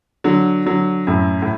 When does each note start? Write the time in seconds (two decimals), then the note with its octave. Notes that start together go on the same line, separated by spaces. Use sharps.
0.24 D3 F#3
0.66 D3 F#3
1.07 F#2 A2
1.42 A2